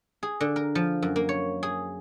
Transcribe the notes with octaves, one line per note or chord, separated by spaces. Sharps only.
G#4
D3
A#4
F3
F#2
A#3
C#5
G#4